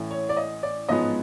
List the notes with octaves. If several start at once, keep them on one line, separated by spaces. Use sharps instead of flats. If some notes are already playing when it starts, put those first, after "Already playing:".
Already playing: A1 A2 E3
C#5
D5
D#5
D5
A1 G#2 F3 G#3 B3 D#5